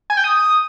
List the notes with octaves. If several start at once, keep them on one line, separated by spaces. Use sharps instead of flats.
G#5
G5
D#6